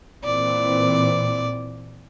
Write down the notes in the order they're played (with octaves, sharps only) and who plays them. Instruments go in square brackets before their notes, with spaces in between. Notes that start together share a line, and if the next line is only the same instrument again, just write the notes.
[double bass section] A#2 E3 C4 [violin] D5